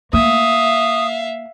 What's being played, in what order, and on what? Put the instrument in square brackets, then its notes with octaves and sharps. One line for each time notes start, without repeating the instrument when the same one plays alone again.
[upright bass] A#3 [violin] E5 F5 [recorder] D#6